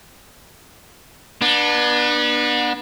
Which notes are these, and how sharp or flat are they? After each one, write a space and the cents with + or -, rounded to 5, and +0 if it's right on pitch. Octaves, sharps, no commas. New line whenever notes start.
B3 -30 D4 +20